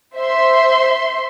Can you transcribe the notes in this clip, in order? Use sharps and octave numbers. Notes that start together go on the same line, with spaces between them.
C5 E5 C6